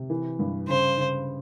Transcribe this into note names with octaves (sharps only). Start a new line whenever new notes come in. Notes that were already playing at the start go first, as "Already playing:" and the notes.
Already playing: C3
E3
G2
C#3 C5
C#3